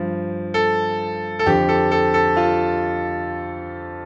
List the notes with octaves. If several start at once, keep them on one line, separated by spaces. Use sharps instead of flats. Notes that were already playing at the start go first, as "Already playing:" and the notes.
Already playing: G2 F3
A4
A4
F2 D3 F3 G4
A4
A4
A4
F4